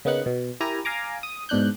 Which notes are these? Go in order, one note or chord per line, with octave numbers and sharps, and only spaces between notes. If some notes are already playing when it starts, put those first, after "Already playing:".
C#3 A#3 B3 D#4 F#5 F#6
B2
E4 G4 A#4 G#5 A#5
F5 G#5 A#5 D6
D#6
G#2 B2 D4 F#6 G6